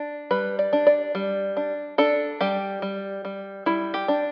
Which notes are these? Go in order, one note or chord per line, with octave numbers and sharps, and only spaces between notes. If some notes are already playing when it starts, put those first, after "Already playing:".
Already playing: D4
G3 B4
D5
D4
D5
G3
D4
D4 A4
G3 G4
G3
G3
G3 E4
G4
D4